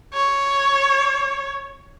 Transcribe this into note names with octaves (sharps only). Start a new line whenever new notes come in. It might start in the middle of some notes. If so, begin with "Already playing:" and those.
C#5